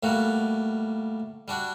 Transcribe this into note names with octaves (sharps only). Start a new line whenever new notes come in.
A2 G3 A#3 F#4
G3 D4 F#4